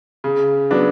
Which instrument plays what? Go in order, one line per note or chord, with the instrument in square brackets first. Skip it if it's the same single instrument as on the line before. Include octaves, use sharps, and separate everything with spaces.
[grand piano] C#3
F#3 B3 D4